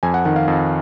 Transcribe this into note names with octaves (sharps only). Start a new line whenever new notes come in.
F2 G#5
F#5
D#3 F#5
F5
F2